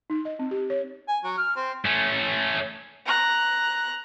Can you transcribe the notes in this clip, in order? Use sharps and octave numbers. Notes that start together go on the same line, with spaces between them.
D#4
D#5
C4
G4
C#5
G#5
F#3
F6
C4
A3 C#4
A#5 F#6